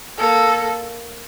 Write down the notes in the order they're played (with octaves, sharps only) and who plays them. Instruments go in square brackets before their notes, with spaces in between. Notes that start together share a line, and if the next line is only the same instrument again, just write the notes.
[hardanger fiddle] A#3 [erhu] A4